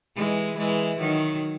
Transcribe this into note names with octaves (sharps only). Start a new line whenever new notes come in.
E3 G#3
E3 G#3
D#3 F#3